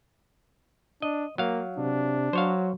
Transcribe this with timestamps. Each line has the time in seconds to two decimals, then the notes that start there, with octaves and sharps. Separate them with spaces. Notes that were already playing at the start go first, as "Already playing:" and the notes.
1.02 D4 D#5
1.38 F#3 A#3 F5
1.78 C3 D4
2.33 F#3 C5 C#5 F5